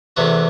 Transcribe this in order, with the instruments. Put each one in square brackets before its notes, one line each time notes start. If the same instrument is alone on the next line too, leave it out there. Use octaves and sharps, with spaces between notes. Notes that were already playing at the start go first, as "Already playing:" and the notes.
[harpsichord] E2 C3 E3 A3 F#4